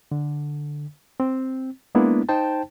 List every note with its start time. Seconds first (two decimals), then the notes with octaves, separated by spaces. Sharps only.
0.12 D3
1.20 C4
1.95 G#3 A#3 B3 D4 E4
2.29 D#4 C5 G5 A5